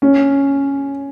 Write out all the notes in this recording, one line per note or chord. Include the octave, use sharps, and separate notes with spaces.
C#4